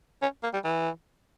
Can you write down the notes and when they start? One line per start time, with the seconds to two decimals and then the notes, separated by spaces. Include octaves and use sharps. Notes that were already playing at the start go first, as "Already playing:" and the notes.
0.22 C#4
0.43 A#3
0.53 G3
0.64 E3